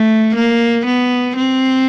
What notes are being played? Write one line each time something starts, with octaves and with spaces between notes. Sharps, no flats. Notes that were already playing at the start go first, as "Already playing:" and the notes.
Already playing: A3
A#3
B3
C4